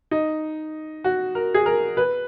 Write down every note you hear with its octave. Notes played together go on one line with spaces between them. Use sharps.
D#4
F#4
A#4
G#4
A#4
B4